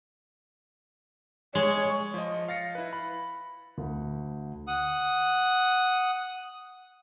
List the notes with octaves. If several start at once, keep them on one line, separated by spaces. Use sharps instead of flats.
G#3 C#5
F3 D#5
F5 A6 A#6 C#7
E4 B4
B5
D2
F#5 D#6